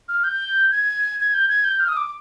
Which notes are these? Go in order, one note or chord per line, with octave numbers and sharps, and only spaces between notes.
F6
G6
G#6
G#6
G6
G#6
G6
F6
D#6
D6